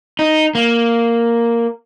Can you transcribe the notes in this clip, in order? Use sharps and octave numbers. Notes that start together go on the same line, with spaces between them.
D#4
A#3